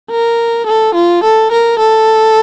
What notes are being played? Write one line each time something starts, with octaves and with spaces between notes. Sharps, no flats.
A#4
A4
F4
A4
A#4
A4